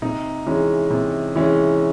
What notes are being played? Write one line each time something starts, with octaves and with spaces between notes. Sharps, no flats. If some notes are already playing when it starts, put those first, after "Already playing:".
C3 D#4
E3 G#3 C#4
C3
E3 G#3 C#4